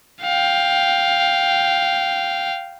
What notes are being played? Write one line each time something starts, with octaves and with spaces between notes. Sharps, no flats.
F5 G5